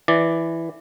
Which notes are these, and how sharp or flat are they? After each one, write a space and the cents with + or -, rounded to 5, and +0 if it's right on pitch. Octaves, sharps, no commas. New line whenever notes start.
E3 +5 D5 +0